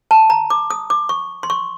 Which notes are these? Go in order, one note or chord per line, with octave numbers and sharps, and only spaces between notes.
A5
A#5
D6
D#6
D6
C#6
C6
C#6